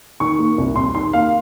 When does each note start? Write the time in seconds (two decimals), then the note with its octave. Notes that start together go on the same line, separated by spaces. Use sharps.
0.20 D#3 C#6
0.39 A#3
0.58 C2
0.76 C3 C6
0.95 D#3 C6
1.13 A#3 F5